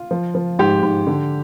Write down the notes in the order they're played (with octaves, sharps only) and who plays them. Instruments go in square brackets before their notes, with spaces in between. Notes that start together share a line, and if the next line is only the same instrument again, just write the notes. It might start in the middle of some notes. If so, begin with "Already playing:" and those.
Already playing: [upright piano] F4
F3
F3
G#2 G4
G#2
D3